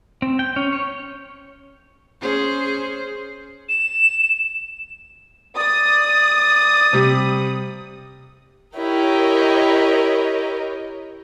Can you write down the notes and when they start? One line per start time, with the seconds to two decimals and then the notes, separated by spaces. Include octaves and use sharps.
0.22 C4
0.39 G5
0.56 C#4
0.72 C#5
2.21 C#4 G#4 C5
3.69 E7
5.57 D5 D#6
6.93 C3 G3
8.76 E4 G4 A#4 C#5 D#5